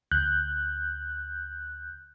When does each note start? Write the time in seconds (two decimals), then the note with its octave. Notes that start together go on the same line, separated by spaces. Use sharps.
0.11 D2 F#6 G6